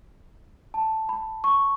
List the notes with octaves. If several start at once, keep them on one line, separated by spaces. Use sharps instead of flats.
A5
B5
C#6